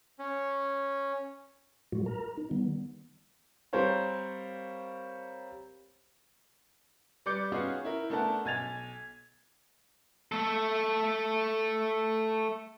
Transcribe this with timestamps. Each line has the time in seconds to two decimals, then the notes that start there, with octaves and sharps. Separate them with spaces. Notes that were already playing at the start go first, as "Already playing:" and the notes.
0.19 C#4
1.92 A2 F#3 G#3 F4 F#4
2.06 A#4 A#5
2.37 D#4
2.51 D#3 G3 B3
3.73 G3 C4 A#4 C5 C#5 F5
7.26 G3 B4 D5 D6 G6 C#7
7.52 B3 C#4 D#4 F4 F#4 G#4
7.85 E4 A#4
8.10 A3 B3 D4 A#4 F#5 A5
8.45 B1 G#5 G#6 A6 F7
10.32 A3 A4